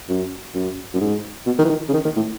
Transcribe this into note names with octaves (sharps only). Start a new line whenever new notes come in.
F#2
F#2
F#2
G#2
B2
D#3
E3
D#3
C#3
D#3
D#3
A2